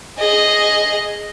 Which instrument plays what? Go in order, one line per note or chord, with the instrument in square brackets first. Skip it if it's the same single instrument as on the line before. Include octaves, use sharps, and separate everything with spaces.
[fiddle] G#4 D#5